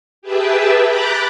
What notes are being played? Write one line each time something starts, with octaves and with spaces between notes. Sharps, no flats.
G4 G#4 B4 E5 G5 A5
A#5 B5 D6 F#6 G6 A6